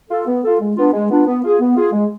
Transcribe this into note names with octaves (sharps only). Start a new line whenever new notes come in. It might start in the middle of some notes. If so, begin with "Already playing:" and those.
F4 A4
B3
F4 A4
G#3
B3 D4 F4
G#3
B3 D4 F4
B3
F4 G#4
B3
F4 G#4
G#3